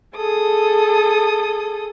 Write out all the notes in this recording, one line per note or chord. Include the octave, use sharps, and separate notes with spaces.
G#4 A4 D#6